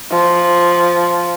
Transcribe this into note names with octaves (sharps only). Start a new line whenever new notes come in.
F3